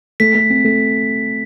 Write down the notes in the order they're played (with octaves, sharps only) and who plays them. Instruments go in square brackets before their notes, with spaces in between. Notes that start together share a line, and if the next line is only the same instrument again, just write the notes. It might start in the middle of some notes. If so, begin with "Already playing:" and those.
[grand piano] A3 [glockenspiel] B6
[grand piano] A3
C4
A3